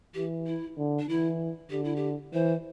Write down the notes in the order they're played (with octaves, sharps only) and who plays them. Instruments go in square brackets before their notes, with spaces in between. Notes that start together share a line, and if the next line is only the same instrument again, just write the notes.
[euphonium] E3 [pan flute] G4
[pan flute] E4
[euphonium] D3
[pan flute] D4
[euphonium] E3 [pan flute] E4
[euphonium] D3 [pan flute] G4
[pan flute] E4
G4
[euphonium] E3 [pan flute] C5